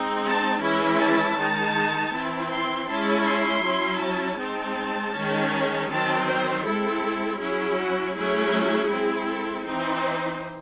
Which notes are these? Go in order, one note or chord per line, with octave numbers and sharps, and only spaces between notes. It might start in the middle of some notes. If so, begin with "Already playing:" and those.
Already playing: G#3 C4 D#4
A5
E3 G#3 C#4 E4
A5
D#3 G#3 D#4
E3 C4 E4
C6
G#3 C#4 E4 A5
C6
F#3 C#4 E4
A5
G#3 C4 D#4 A5
D#3 G#3 C#4
D#3 F#3 C4 A5
C5
G#3 C4 E4 A4
F#3 C#4 E4 G#4
F#4
F#3 A3 C#4 E4 G#4
G#3 C4 E4
A4
E3 C4 D#4 C5